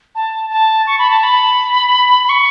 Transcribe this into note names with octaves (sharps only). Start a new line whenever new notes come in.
A5
A5
C#6
B5
A5
B5
B5
C#6